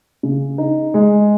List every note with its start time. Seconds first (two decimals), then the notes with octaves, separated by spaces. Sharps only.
0.23 C#3
0.58 D#4
0.94 G#3